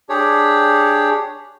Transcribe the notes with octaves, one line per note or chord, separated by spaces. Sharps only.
D4 G4 G#4 C#5